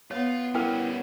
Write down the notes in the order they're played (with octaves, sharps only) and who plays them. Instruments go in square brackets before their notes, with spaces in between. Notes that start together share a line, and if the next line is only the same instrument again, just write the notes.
[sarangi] B3 [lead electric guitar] F4 [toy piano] C#5
[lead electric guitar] G3 C#4 [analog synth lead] E4 [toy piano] A#4 B4 G5